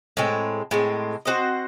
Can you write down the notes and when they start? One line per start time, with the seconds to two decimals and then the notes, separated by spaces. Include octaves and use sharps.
0.17 A2 G#3 C4
0.71 A2 G#3 C4
1.25 C4 F#4 C5 D#5